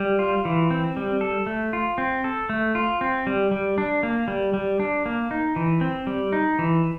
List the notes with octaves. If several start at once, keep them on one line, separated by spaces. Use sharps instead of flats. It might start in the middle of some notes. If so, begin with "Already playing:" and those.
Already playing: G3
F4
E3
C4
G3
A4
A3
F4
C4
A4
A3
F4
C4
G3
G3
D4
A#3
G3
G3
D4
A#3
D#4
E3
C4
G3
D#4
E3